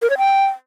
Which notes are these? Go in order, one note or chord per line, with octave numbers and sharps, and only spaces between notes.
A#4
C#5
G5